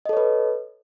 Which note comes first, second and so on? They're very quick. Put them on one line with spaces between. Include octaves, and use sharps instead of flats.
D#5 A4 C#5 B4